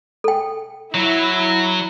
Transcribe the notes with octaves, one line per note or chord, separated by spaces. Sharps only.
A4 G5
F#3 E4